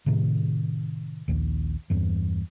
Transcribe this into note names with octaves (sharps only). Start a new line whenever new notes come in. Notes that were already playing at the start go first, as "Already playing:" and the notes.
A2 C3 D#3
A#1 D#2
E2 G2 E3